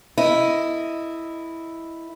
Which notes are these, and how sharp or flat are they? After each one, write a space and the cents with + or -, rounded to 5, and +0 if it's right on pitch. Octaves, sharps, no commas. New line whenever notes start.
E4 +0 A#4 -35 D#5 +0